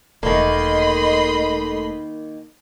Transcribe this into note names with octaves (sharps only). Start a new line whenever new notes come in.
E1 D#3 A3 A#3 D#5 B5 C6